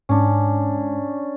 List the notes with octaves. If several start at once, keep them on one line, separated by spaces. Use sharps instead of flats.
G#2 C#4 D4